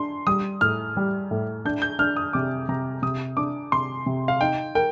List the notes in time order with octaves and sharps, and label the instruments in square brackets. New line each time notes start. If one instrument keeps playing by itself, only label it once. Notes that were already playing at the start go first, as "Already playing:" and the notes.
Already playing: [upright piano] D4 [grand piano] C6
[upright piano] G3 [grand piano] D#6
[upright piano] A2 [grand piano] F6
[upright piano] G3
A2
[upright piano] D4 [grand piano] G6
[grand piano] G6
[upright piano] D4 [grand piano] F6
[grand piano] D#6
[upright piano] C3 [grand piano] D6
[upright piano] C3 [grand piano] A#5
[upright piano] C3 [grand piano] D#6
[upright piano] D4 [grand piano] D6
[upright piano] C3 [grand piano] C6
[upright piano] C3
[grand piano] F5
[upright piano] D#4 [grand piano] G5
[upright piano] A#4 [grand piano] G5